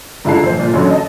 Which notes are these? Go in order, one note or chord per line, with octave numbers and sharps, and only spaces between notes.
G#2 D3 E4 F4 A5 C7
A#1 C5
A#2
A1 F#2 D3 F#3 C#5 C6
D#5 A5